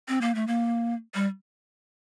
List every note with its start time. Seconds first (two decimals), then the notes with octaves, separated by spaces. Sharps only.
0.08 C4
0.21 A#3
0.35 A3
0.47 A#3
1.15 G3